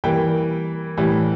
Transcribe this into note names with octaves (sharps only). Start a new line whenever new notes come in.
E3 G3 A#3 G5
A2 E3 G3